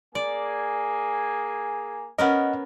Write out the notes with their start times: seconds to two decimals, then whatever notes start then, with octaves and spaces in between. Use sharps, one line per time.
0.15 A#3 G#4 D5 G#5
2.18 B3 C#4 A#4 D#5 F#5